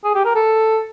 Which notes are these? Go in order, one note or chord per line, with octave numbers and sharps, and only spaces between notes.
G#4
G4
A#4
A4